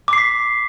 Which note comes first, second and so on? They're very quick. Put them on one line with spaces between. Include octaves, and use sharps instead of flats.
D6 C7 B6